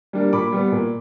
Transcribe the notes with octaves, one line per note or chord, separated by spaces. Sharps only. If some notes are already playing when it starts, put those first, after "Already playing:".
G3 A#3 D4
A#2 B5 D6
G3 B3
A#2